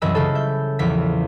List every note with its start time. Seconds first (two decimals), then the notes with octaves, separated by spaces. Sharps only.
0.02 C2 F#2 E3 D#5 B5 E6
0.15 C#3 F4 A4
0.35 E5 G6
0.79 A#1 E2 E3 F3 B6